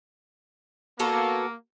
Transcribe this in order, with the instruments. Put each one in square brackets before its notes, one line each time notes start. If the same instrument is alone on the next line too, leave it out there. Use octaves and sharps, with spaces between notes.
[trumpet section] A#3 [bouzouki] B3 F#4 A4